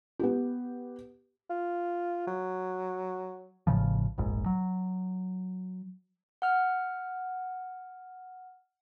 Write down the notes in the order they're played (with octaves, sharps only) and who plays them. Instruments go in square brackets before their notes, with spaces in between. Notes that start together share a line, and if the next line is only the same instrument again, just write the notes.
[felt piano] B3 G4
[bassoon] F4
F#3
[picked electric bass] A1 A2 C#3 F3
F1 A#1 G#2
F#3
[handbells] F#5 F6